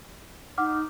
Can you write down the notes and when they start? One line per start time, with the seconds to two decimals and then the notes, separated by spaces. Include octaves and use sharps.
0.58 D#4 F#5 D6 F6